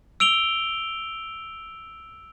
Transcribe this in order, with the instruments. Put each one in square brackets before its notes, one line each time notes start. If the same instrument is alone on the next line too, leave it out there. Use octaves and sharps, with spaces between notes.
[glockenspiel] E6 D7 F7 G7